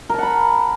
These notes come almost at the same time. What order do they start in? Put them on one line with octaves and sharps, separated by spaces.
A#4 A5 F#5 B5